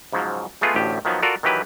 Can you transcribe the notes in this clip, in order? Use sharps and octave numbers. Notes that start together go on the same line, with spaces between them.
G#2 C#3 F3 F#3
G#3 A3 B3 F4 G#4
A1 D2 A2 G4
D#3 F3 F#3 B3
F4 F#4 A4 A#4 D5
D#3 E3 F#3 G4 B4